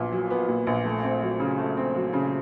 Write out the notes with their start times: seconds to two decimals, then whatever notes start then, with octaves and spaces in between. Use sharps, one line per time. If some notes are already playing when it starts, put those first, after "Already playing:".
Already playing: A#1 A#2 F#3 B3
0.12 F#3
0.30 B3
0.49 A#2
0.67 A#1
0.85 A3
1.03 C4
1.22 F#3
1.40 C#3
1.58 A3
1.77 C4
1.95 F#3
2.13 C#3